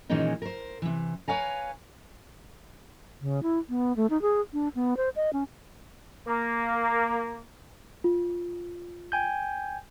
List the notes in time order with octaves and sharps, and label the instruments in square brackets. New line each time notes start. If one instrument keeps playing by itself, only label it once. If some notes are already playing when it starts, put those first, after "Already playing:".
[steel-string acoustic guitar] A#2 D#3 E3 G#3 C#4 D#4
A#4 C5
C3 E3
B4 C#5 F5 G#5 A#5
[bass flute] C#3
E4
B3
A3
D#4
G#4
D4
B3
C5
D#5
C#4
[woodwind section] A#3
[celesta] F4
[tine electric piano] G5 G#5 G6